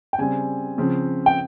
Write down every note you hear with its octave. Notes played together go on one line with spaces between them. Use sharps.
G5
C#3 G3 C4 G#5
C#3 F3 C4
G5